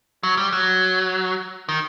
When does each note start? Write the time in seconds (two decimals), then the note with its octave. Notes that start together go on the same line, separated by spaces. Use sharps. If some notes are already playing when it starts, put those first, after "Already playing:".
0.23 F#3
0.37 G3
0.53 F#3
1.69 D#3